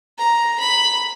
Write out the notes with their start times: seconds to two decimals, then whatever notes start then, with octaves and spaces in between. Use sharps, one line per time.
0.18 A#5
0.60 B5